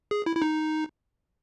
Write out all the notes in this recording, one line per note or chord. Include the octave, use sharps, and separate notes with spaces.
G#4
E4
E4
D#4